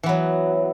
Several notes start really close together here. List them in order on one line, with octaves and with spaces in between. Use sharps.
E3 B3 F#3